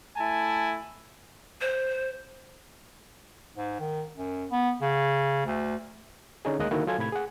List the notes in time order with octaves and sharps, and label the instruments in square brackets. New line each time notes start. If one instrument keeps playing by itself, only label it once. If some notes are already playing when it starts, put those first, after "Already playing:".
[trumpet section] A3 E4 G#5 A5
[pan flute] C5
[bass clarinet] G#2
D#3
F#2
B3
C#3
D2
[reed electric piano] D3 C#4 D#4 G#4
D2 D#3 G#3 A#3 D#5 F#6
D3 D#3 A#3 D#4 E4 F#4
F#3 F4 A4 G#5 G#6
A2 C3 B5 G#6
G#4 F#5